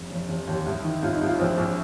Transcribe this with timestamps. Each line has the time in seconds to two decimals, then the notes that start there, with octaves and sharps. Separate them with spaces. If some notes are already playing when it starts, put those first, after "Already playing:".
Already playing: F1
0.11 F1
0.29 F1
0.47 D#2
0.66 C2
0.84 D#3
1.03 C2 F4
1.15 D#4
1.21 C2
1.27 F4
1.39 A#1 C4
1.58 A#1